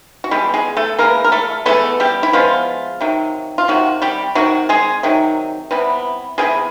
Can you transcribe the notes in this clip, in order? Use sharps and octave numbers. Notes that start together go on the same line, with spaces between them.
F#4
E3 G3 G#3 B3 G4
G#3 G#4
A3 A4
E3 G#3 A#3 B3 A#4
A#4
A3 A4
E3 G#3 A3 B3 A4
G3 G4
E4
E3 F3 G#3 B3 F4
C3 D#3 F#3
F4
C3 D#3 F#3 F#4
G3 G4
C3 D#3 F#3 F#4
G#3 G#4
C3 D#3 F#3
C3 E3 G3 B3
C3 E3 G3 G#3 B3 G#4